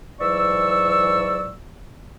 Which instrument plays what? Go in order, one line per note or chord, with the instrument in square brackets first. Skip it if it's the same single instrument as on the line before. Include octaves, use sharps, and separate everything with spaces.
[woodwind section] G#2 E3 F#3 D5 C#6 E6